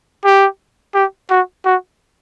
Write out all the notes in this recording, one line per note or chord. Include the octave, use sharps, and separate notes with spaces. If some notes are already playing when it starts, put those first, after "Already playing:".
G4
G4
F#4
F#4